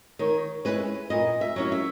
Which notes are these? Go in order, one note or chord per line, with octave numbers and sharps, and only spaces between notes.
D#3 C#5
G#3 C#4 E4 B4
A#2 D#5
E5
F#3 C#4 E4
E5